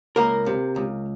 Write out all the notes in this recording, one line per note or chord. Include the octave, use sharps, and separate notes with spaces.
C#2 A#3 A#4
C3
C#2